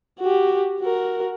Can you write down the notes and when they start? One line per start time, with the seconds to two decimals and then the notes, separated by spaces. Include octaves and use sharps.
0.20 F#4 G4
0.81 F#4 A#4